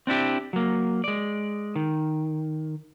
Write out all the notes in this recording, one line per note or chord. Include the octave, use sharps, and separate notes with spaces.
C4 D4 E4 G4
F#3 A#3
G#3 D5
D#3